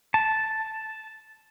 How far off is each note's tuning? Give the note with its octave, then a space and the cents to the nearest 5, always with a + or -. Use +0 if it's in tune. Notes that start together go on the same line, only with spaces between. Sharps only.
A5 -5